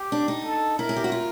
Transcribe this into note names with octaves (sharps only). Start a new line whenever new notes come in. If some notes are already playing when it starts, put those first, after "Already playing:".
Already playing: G4
D4
D#4
A4
E4 A#4
G#4
G4
F#4
F4